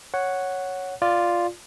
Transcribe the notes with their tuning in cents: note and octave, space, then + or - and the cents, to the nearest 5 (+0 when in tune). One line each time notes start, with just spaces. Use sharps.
C#5 +0 F#5 +0
F4 +0 D5 +0